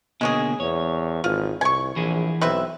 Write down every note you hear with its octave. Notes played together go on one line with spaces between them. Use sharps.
B2 D3 G#3 A#3 C#4 G#4
E2 C#5
G#1 F4
C2 G#5 C#6
A#1 E3 E4 G#4
B1 C4 B4 E5